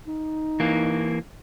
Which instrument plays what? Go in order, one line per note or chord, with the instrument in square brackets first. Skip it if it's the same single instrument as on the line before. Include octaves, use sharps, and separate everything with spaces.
[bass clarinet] D#4
[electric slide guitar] E3 A#3